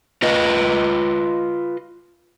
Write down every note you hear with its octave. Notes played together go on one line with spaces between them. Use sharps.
F4 B4 D#5